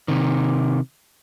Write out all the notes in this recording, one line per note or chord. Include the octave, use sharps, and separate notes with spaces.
C3 D#3